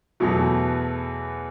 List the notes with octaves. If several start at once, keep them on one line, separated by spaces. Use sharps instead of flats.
E2 B2 F#3 A3